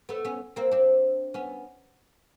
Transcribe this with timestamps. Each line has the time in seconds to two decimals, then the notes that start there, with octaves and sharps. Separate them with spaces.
0.09 A3 B3
0.25 B3 C#4
0.56 A#3 C4
0.71 C4 D4
1.34 B3 C#4